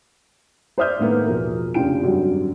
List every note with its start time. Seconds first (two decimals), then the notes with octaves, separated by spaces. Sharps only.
0.78 C5 D5 E5 D#6 F6 G6
0.99 A2 D#3 G#3 A#3 B3
1.26 E1 F3 A#4
1.74 F1 C#3 D4 F4 G5 D7
2.02 G#1 F#2 D3 F#3 G3 F#4